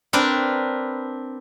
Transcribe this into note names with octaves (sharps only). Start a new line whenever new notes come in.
C4 D4 A#4 B4